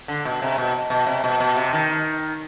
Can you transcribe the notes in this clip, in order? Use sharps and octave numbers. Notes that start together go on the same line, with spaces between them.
D3
B2
C3
B2
B2
C3
B2
B2
C3
D#3